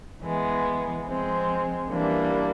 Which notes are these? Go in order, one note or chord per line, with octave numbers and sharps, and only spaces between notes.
E3 G#3 B3
F3 G#3 C4
E3 G3 A#3 D4